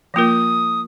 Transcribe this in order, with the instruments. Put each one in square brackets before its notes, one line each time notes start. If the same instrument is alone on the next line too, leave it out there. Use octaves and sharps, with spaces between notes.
[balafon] F3 A#3 F4 A#4 [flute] D#6